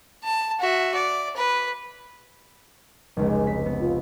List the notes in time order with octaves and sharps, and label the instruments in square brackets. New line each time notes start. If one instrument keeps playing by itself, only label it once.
[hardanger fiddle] A5
F#4 E5
D5
B4
[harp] F1 C#2 [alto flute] G#3
[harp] B6
B3
[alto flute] F4